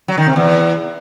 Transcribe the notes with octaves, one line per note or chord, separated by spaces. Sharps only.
F#3
D#3
C3
E2